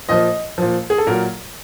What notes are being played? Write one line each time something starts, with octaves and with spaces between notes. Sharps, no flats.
A#2 F3 D#5
A#2 F3
G#4
A4
A#2 F#3 A#4